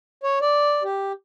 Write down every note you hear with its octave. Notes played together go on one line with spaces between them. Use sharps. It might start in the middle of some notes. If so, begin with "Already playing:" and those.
C#5
D5
G4